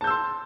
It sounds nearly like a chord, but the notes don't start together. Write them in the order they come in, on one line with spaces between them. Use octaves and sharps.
A5 G6 E6 C6